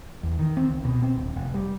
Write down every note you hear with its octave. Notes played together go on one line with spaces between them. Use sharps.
E2
D#3
C4
C#2
B2
C4
D1
F1
G3